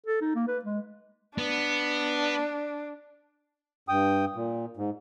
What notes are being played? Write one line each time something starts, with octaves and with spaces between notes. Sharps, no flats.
A4
D#4
A#3
B4
G#3
B3 D4
G2 G5 D#6
A#2
G#2